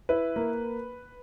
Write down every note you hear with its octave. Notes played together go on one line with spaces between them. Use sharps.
E4 B4
A#3